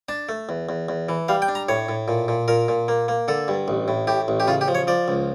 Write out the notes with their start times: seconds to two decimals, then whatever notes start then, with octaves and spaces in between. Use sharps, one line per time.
0.09 D4 A5
0.29 A3
0.49 E2
0.69 E2
0.89 E2
1.09 E3
1.28 G3 F5
1.42 G5
1.48 D4
1.55 A#5
1.69 A2 C#5
1.89 A2
2.08 A#2
2.28 A#2
2.48 A#2 A#4
2.68 A#2
2.88 A#3
3.08 A#3
3.28 D3 A4
3.48 G2
3.68 A1
3.88 A2
4.07 A2 G4
4.28 A1
4.40 G4
4.47 C#3 F4
4.61 G4
4.68 F3
4.75 C#5
4.87 F3 D5
5.08 C#2